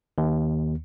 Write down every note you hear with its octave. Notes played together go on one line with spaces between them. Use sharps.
D#2